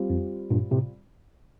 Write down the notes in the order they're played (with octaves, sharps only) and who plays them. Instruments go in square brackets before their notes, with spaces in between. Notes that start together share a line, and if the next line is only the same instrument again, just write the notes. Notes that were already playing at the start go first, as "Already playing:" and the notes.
Already playing: [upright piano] G3 C4 F4
[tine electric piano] F2
G2 A#2
A2 C3